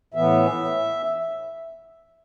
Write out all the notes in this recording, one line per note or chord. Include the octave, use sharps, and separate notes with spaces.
A2 E3 B3 E5